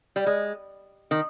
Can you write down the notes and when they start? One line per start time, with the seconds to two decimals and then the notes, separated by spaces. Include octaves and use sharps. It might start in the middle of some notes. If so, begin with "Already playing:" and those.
0.16 G3
0.26 G#3
1.11 D#3